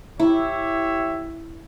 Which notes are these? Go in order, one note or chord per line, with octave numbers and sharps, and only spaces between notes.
E4 G4 C#5 E5